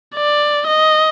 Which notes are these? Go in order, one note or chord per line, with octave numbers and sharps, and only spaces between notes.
D5
D#5